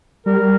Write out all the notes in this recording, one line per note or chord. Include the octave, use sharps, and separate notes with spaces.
G3 A#4